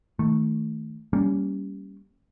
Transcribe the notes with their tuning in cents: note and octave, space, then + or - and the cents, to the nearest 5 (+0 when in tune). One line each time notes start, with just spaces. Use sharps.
D#3 +20 A3 +0
G3 +0 A#3 +0 C#4 +10